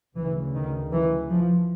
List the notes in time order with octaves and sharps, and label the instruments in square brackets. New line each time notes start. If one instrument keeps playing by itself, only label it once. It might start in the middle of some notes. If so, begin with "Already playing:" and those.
[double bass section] D2 C#3 E3
D#3
E3
F3